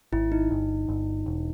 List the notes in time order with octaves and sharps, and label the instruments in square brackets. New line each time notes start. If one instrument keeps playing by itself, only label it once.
[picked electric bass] G#1 [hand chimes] E4
[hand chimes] D#4
[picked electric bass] G1
G1
E1